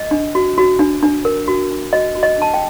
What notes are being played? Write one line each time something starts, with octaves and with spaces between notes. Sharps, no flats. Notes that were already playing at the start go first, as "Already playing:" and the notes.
Already playing: D#5
D4
F#4
F#4
D4
D4
A#4
F#4
D4
F#4 D#5
F#4
D#5
D4 A5
G5